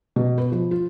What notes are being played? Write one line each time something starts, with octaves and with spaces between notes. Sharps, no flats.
B2
B4
F3
F4